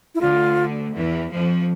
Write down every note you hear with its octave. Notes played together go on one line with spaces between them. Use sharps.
E4
D2 D3 F4
E2 E3
F2 F3